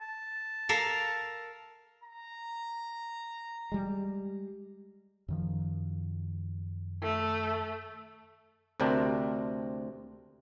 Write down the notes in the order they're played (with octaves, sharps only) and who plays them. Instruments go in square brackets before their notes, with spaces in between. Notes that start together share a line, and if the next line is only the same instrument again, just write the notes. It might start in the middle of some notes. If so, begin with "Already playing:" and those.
[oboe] A5
[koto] A4 A#4 F5
[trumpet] A#5
[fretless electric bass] G3 G#3
[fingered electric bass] F#2 D#3 F3
[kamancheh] A3
[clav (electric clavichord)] D2 C3 C4 D4 A#4